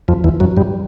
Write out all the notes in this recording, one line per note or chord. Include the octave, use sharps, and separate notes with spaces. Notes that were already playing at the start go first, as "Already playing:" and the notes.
F2 F3
E2 E3
F#2 F#3
G2 G3